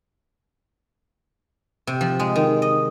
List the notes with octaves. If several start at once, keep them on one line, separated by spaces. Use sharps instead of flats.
C3
F3
G#3
D#3
D#5